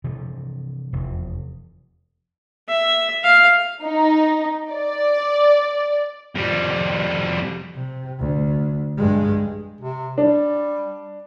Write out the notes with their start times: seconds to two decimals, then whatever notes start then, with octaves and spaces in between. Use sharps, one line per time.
0.04 C3 E3 F3
0.93 F1 E2
2.69 E5
3.24 F5
3.83 D#4
4.72 D5
6.35 F2 G3
7.75 C3
8.19 D2
8.98 G2 G#3
9.81 C3
10.18 G3 D4